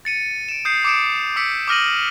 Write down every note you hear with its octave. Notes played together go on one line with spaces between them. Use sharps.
A6 C#7 D#7
D7 E7
D#6 G6 C7 C#7
D6 D#6 C#7 D7 E7
D6 E6 B6 C#7 D7
D6 D#6 F6 A#6 D#7 F#7